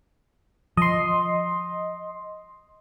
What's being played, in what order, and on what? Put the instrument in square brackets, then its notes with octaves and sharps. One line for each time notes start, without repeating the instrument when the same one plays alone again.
[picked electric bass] F3 [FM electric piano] D#5 C6